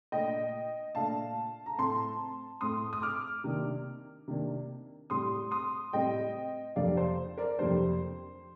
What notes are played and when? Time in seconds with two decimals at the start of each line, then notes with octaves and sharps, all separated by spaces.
0.12 A#2 A3 D4 D#5 G5
0.95 A#2 A3 D4 F5 A5
1.66 A#5
1.78 A2 A3 C4 A5 C6
2.61 A2 A3 C4 C6 D#6
2.93 D#6
3.02 D6 F6
3.44 C3 D#3 A#3 D4
4.28 C3 D#3 A#3 D4
5.10 A2 G3 C4 C6 D#6
5.51 C6 D#6
5.93 A2 G3 C4 D#5 G5
6.76 F2 C3 G3 A#3 D4 D5 F5
6.97 C5
7.37 A#4 D5
7.59 F2 C3 G3 A#3 D4 C5